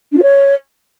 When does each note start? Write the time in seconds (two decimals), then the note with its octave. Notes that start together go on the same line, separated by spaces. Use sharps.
0.12 D4
0.17 F4
0.22 C#5